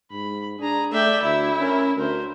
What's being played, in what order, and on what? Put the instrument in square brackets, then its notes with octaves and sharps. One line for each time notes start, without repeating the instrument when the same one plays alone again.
[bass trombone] G#2 [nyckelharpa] B5
[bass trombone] D4 [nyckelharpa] G#4 A#5
[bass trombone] A3 [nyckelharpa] D5 G5 [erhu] E5
[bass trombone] D2 [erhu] E4 [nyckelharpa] E5
[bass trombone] C#4 [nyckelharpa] A#4
[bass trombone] D2 [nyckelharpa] A#4 C5